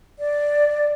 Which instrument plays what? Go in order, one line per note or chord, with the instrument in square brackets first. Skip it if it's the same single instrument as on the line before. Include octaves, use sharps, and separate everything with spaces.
[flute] D5